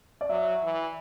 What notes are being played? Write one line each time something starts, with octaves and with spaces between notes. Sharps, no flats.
D5
F#3 E5
E3